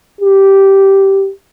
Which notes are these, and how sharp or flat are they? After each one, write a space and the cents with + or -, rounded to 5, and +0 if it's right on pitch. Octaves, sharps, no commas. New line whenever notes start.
G4 -10